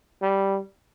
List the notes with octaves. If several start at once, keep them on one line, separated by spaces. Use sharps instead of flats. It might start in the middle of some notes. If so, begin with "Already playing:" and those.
G3